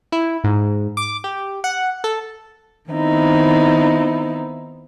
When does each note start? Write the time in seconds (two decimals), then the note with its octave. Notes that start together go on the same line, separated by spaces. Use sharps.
0.12 E4
0.44 G#2
0.97 D6
1.24 G4
1.64 F#5
2.04 A4
2.91 D#3 B3 C4 D#4 E4